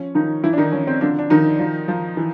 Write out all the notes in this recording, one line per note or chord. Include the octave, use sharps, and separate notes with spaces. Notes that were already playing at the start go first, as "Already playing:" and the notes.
Already playing: F3 C#4
D#3 F3 D#4
E3 F3 E4
D4
D#3 D#4
F3 C#4
C4
D3 F3 D4
D4
D#3 F3 D#4
F3
F3
E3